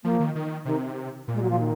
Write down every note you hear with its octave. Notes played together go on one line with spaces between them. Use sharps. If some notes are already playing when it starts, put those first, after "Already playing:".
F3 A#3
D#3
D#3
C3 D#3
A#2
G#3
F#3
F3
D#3